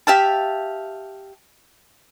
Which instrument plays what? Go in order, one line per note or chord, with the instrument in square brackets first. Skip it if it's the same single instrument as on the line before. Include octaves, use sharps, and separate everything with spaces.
[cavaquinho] G4 E5 F5 A5